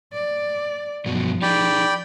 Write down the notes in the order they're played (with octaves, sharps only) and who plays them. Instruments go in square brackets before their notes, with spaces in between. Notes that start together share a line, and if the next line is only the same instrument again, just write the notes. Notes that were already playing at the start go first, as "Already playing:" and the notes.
[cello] D5
[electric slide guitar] G2 B2 F#3 [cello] F3
[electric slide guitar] D#4 G4 G#4 [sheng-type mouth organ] D5 G5 B5